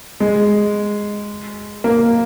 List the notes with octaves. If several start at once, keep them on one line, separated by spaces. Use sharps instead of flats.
G#3
A#3